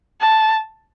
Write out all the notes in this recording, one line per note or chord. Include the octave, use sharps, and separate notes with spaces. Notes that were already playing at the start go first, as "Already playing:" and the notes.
A5